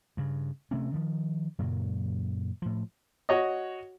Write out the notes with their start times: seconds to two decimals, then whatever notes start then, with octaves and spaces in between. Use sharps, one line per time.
0.17 G2 C#3
0.71 C3 A3 C4 C#4
0.94 D#3 F3
1.59 F#2 A#2 C#3 F#3
2.62 A2 F3
3.29 F#4 C#5 D#5